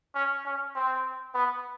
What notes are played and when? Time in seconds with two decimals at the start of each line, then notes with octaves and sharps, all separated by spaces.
0.15 C#4
0.45 C#4
0.75 C4
1.35 B3